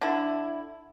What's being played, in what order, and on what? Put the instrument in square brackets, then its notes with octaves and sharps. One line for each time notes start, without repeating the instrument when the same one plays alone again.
[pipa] D3 E4